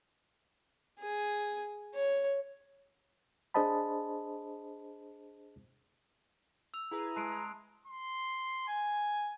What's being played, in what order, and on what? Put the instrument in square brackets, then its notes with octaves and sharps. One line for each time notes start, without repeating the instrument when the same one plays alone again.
[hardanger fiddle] G#4
C#5
[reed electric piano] D4 G#4 C5 D#5 A5 B5
[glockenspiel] E6 F7
[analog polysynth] E4 G#4 B4 [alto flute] A#5
[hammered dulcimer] G#3 [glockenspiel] A5 C7 D7
[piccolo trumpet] C6
G#5